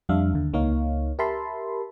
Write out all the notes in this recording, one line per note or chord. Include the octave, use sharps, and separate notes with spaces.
F2 G3 D4 E5 F5
D#2 D3
C#2 A#3 D#4 C#5 F5
G4 A#4 E5 A5 B5 C6